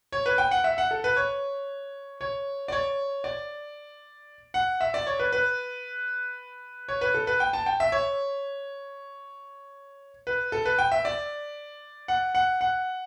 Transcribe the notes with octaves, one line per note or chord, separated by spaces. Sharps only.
C#5
B4
G5
F#5
E5
F#5
A4
B4
C#5
C#5
D5
C#5
D5
F#5
E5
D5
C#5
B4
B4
C#5
B4
A4
B4
G5
A5
G5
E5
C#5
B4
A4
B4
G5
E5
D5
F#5
F#5
F#5